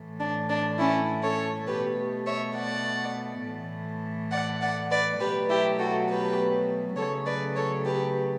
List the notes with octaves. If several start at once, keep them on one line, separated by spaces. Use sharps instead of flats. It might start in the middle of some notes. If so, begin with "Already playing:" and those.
Already playing: A2 E3 A3
D4
D4
C#4 E4
A4 C#5
B2 A3 G4 B4
C#5 E5
D5 F#5
A2 E3 A3
D5 F#5
D5 F#5
B4 D5
B2 F#3 A3 G4 B4
E4 G4
F#4 A4
G4 B4
C#3 F#3 A3 A4 C#5
B4 D5
A4 C#5
G4 B4